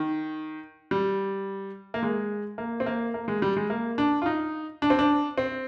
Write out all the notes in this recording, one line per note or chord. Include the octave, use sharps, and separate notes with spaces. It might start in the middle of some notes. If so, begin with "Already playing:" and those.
Already playing: D#3
G3
A#3
G#3
A#3
C4
A#3
A#3
G#3
G3
G#3
A#3
D4
F4
D#4
D4
C4
D4
C4